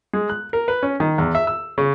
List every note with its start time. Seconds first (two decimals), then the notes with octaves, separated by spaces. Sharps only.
0.13 G#3
0.29 F#6
0.53 A#4
0.68 B4
0.83 C#4
1.00 D#3
1.18 E2
1.35 E5
1.47 E6
1.78 C#3